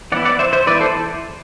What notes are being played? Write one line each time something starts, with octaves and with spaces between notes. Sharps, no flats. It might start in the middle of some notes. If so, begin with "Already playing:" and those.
E3 B3 E4 D5 F#5
D5 F#5
C5 E5
C5 E5
E3 B3 E4 B4 D5
A4 C5